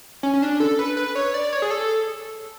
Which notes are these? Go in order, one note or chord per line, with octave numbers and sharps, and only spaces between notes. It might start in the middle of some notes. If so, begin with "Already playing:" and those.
C#4
C#4
D4
A4
B4
B4
C#5
D5
C#5
G#4
A4